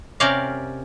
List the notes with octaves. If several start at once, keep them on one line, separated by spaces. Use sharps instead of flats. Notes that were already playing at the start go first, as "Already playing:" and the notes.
C3 C#4 G4 A#4 D5 F5